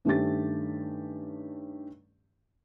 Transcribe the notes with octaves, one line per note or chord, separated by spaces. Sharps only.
G2 D#3 A3 C#4 G4 A6